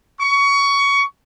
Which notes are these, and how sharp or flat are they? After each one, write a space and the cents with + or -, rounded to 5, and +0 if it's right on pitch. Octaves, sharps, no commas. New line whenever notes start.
C#6 +20